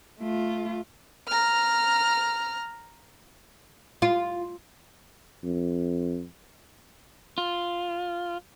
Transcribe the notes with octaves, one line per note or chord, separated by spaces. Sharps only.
A3 F4
A#5 F6
F4
F2
F4